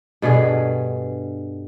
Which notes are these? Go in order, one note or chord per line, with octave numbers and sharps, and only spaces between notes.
G2 B2 D3 G#4